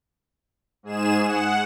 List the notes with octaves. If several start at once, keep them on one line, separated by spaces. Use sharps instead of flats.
G#2 G#4 E7
F#5